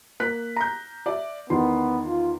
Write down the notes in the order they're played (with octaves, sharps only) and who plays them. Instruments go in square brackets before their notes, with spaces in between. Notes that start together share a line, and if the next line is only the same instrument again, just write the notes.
[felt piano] A#3 F#6 B6
A#5 G6
D5 E5
[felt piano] E2 D#3 C6 [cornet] B3
[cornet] F4